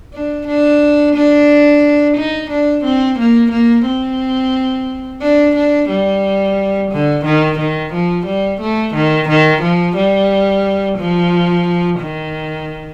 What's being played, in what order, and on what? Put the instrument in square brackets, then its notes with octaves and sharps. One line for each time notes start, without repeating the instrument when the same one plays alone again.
[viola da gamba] D4
D4
D4
D#4
D4
C4
A#3
A#3
C4
D4
D4
G3
D3
D#3
D#3
F3
G3
A3
D#3
D#3
F3
G3
F3
D#3